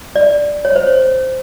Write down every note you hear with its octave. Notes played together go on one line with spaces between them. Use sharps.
D5
C#5
C5
C#5